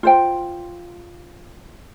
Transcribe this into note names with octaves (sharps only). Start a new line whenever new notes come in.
F4 C5 G5